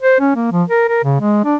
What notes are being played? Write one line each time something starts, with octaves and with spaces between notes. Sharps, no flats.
C5
C#4
A#3
F3
A#4
A#4
C#3
G#3
D4